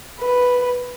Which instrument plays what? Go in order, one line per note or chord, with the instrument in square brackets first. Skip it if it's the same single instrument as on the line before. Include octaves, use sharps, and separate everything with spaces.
[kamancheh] B4